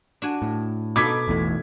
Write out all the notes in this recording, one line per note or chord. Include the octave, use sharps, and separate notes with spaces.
D4 F#4 G#5
A2
B2 D#4 A4 D6 G#6 B6
A1 E2 A2